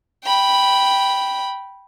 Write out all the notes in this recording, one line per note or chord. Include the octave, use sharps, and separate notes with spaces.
G5 B5